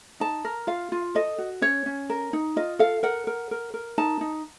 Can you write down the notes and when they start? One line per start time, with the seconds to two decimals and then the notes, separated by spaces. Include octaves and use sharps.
0.20 D#4 A5
0.45 A#4
0.67 F4 F5
0.92 F4
1.15 A4 D#5
1.38 F#4
1.61 C#4 C#5
1.86 C#4
2.10 A#4
2.33 D#4
2.56 F4 D#5
2.79 A4 F5
3.03 A#4 F#5
3.27 A#4
3.51 A#4
3.74 A#4
3.98 D#4 A5
4.21 D#4